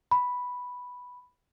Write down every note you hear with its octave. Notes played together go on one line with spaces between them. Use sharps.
B5